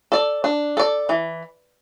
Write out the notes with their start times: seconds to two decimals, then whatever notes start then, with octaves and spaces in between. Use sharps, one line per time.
0.12 A4 D5
0.44 D4
0.77 A4 D5
1.09 E3